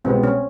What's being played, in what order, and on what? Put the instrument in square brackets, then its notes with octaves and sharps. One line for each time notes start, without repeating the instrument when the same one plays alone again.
[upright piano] C2 B2 G#3 B3 [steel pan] C4
[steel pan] C#4